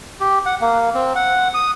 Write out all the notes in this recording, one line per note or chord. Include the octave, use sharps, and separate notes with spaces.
G4
F#5
A#3
C4
F#5
D#6